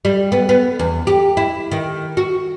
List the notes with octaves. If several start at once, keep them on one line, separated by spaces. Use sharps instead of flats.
G3
B3
B3
E2
G4
E4
D#3
F#4